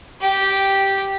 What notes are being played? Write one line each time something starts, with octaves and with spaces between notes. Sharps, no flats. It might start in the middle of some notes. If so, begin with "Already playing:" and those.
G4